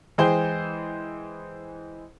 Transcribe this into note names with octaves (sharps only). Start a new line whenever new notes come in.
E3 G#3 G#4 C5 G5 G7